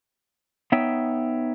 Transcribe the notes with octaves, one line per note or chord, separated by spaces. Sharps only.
B3 D#4 C#5 E5 G5